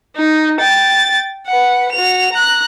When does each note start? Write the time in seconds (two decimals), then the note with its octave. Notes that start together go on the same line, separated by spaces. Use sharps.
0.17 D#4
0.61 G5 A6
1.47 B4 F#5
1.92 F#4 F7
2.32 A#5 F#6